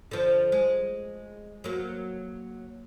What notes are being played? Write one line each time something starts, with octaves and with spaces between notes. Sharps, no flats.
D3 F3
G#3
F#3 A#3